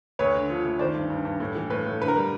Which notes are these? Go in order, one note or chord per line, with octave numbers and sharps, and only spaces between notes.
D2 B4 C#5
D3
F3
D2
D#3 C5 D5
G2
G2
G2
A2
E3
A2 B4
A2
D3 B4
A#4
G3